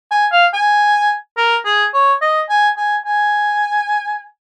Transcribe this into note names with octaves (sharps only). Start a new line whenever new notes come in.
G#5
F5
G#5
A#4
G#4
C#5
D#5
G#5
G#5
G#5